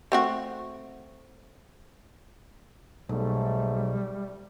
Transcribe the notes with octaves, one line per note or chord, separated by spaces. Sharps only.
A3 C4 F#4
B1 G#2 F#3 G3 A3